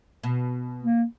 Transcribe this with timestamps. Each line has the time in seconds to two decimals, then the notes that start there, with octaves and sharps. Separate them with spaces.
0.23 B2
0.82 A#3